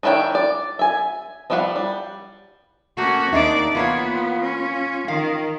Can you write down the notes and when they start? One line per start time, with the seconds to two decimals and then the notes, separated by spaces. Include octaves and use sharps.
0.03 D#3 D4 E4 C#5 G5
0.35 D5
0.79 E5 G#5
1.50 F3 G3 E4 F5 F#5
1.76 G3
2.97 A3 A#3 C#4 F#4
3.32 D#2 D4 D#4 G#4 D5 E5
3.75 E3 A#3 B3 F4 C#5
4.43 C#4
5.08 D#3 F5